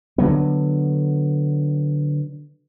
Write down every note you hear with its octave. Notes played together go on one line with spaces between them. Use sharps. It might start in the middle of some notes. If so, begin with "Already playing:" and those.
D3 F#3 B3